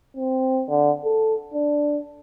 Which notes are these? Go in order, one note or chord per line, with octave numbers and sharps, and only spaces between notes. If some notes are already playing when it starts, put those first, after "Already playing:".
C4
D3
A4
D4